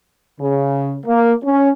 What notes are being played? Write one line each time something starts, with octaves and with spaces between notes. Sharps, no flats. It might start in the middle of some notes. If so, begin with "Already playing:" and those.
C#3
A#3
C#4